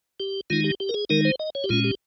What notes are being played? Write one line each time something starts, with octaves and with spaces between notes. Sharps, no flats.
G4
D#3 G#3 D#4 F4
G4
G4
A#4
G#4
D#3 G#3 D#4 A#4
C5
D#5
C#5
G4
A#2 G#3 C#4 F4
G4